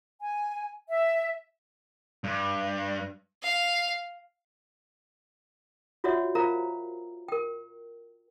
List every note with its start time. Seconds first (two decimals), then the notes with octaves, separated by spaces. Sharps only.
0.20 G#5
0.88 E5
2.24 G2
3.43 F5
6.04 F4 F#4 C#5 D5 E5 F#5
6.35 F4 A#4 C5 F5 A#5
7.28 A#4 G5